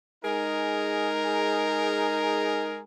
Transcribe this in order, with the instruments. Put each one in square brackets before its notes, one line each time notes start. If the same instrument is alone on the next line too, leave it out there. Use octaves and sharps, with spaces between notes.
[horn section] G#3 D#4 G#4 A#4